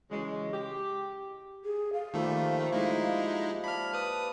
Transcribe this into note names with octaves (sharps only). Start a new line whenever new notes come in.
C#3 E3 F#3 G#3
G4
G#4
F5
D#3 F3 G3 A3 A#3
G#3 D#4 E4
D5 A5 B5 F6
B4 D#6